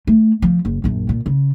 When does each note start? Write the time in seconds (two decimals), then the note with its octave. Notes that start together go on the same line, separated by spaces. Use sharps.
0.07 A3
0.42 F3
0.65 F#1
0.84 A#1 F#2
1.09 A#2
1.26 C#3